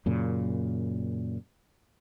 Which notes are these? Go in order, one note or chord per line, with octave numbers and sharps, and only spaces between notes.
F#2 A#2 C#3